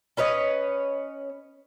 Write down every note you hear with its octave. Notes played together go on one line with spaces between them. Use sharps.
C#4 B4 C#5 D#5